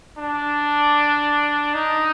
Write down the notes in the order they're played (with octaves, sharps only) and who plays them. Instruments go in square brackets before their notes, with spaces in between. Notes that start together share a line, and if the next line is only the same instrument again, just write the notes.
[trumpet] D4
D#4